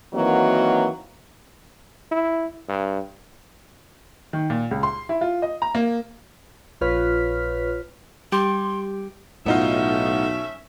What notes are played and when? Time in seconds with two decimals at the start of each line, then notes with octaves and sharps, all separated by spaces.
0.14 D#3 E3 F#3 A#3 C4 F#4
2.11 E4
2.69 G2
4.33 D#3
4.50 A#2
4.71 C#2
4.83 C6
5.09 E4
5.21 F4
5.42 D#5
5.62 A#5
5.75 A#3
6.81 A#1 F4 B4 C#5 F6 B6
8.32 G3 G4 C6
9.46 B1 A2 A3 B3 C#4 D#4 F4 E5